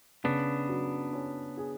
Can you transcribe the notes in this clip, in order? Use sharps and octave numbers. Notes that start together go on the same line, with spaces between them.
C#3 B3 D4
F#3
C#4
G#4